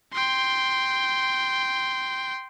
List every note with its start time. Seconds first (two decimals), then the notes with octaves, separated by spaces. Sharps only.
0.13 G5 C6